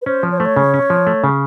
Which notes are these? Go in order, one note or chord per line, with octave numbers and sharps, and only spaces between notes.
B4
C#4 C5
F3
C#5
A3 C5
C#5
C#3
C#4
F3
A3
C#3